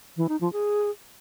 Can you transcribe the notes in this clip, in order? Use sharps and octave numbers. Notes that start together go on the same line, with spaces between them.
E3
D#4
F3
G#4